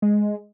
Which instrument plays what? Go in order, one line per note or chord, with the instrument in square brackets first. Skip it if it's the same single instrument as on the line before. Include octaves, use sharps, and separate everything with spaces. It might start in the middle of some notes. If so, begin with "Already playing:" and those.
[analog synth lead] G#3